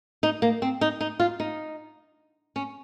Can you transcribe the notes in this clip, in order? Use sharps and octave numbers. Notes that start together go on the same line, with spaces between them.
D#4
A#3
C4
D#4
D#4
F4
D#4
C#4